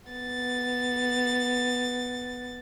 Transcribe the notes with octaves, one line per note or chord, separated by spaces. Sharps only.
B3 A6